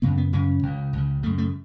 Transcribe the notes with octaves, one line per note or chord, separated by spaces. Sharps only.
F#2 C#3 B3
B3
F#2 C#3 C#4
C#2 C#3
C#2 C#3
F#2 C#3 A3
A3